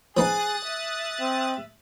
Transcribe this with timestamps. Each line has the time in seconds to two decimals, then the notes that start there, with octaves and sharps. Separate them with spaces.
0.17 F3 B3 D#4 G#4 D#6 F#6 A6
0.66 E5
1.20 C4